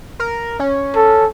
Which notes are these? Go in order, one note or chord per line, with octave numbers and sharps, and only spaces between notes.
A#4
C#4
A4